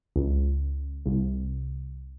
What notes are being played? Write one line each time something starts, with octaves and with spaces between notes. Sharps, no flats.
C#2
C2